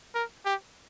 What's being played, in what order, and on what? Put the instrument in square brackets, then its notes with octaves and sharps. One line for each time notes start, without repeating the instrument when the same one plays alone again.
[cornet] A#4
G4